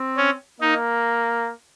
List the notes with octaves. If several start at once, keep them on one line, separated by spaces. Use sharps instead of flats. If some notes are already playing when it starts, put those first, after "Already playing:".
Already playing: C4
C#4
A#3 D#4